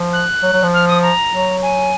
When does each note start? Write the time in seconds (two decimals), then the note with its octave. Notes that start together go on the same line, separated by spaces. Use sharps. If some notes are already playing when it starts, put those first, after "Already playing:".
Already playing: F3
0.13 F#6
0.43 F#3
0.53 F#3
0.63 F3
0.73 F6
0.88 D#6
1.02 A#5
1.33 F#3
1.62 G#5